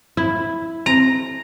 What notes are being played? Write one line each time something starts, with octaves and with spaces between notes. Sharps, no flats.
E4
C4 A#5